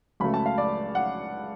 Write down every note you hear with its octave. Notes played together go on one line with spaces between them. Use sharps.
C#2 C#3 F#3 A3 B5
A5
F5
D5
F#5